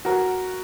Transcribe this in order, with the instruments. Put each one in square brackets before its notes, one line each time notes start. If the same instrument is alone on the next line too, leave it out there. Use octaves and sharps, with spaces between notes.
[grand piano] F#4 A#4